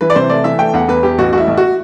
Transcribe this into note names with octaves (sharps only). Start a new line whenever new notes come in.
E3 B4
D5
C3 C5
A3 D5
E3 E5
A3 G5
E2 F#5
E2 B4
E2 G4
A1 F#4
A1 E4 F#4
A1
F#4